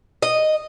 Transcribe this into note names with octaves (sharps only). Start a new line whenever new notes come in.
D#5